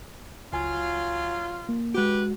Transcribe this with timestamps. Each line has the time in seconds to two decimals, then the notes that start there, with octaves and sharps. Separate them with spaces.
0.53 C#2 F#3 F4 G#5
1.69 A#3
1.95 G#3 F#4 G4 B4